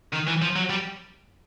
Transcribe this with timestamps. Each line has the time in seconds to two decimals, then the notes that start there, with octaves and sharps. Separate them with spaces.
0.13 D#3
0.28 E3
0.42 F3
0.56 F#3
0.70 G3